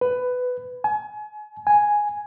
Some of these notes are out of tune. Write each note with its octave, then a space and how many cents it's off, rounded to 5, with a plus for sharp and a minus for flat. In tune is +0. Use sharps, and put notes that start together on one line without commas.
B4 +15
G#5 +35
G#5 +0